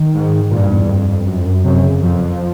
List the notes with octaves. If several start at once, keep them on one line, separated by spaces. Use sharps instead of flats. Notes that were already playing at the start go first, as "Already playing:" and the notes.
Already playing: D#3
G#2
G2 A#2
E2
F2
F#2
F2
F#2
F#2 C3
C#3
F2 F3